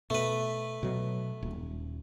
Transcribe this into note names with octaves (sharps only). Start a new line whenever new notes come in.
B2 A3 B4
B2 F#3
D#1